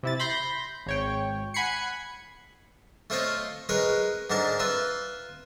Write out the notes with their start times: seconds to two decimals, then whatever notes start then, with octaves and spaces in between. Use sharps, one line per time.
0.03 C3 E4 A6
0.19 B5 C6 G6 A#6
0.86 G#1 C#5 G5
1.54 F#5 G#5 B5 G#6 C7 C#7
3.10 A3 F4 C5 C#5 D#5 F5
3.69 G#3 G#4 A#4 B4 C#5
4.30 G#2 D3 A#4 A5 A#5
4.59 F4 B4 E5